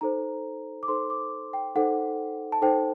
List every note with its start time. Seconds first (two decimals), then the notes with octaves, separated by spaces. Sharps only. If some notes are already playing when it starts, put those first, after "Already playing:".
0.01 D#4 A4 C5 A#5
0.83 D6
0.88 D#4 A4 C5 C6
1.10 D6
1.53 G5
1.76 D#4 A4 C5 F#5
2.52 A5
2.62 D#4 A4 C5 G5